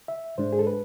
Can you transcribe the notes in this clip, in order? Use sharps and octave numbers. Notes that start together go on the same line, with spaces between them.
E5
G#2 G#3 D4 C5
G#4
A4
B4